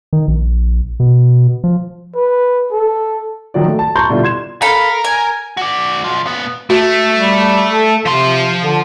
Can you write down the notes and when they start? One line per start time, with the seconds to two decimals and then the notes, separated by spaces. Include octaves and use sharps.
0.13 D#3
0.28 A#1
1.00 B2
1.64 F3
2.16 B4
2.72 A4
3.54 D#3 F3 F#3 F#4 D5
3.67 A3
3.79 A5
3.95 A5 A#5 C6 C#6 G6
4.09 B2 D3 G3 E4 F4
4.23 C6 G#6 E7
4.62 A4 A#4 F5 B5
5.05 G#5
5.57 F#4 D5
6.04 B1 F3
6.26 A#2 B3
6.70 A3 F#4
7.16 G3
7.69 A4
8.06 C3 F3 C6
8.61 D3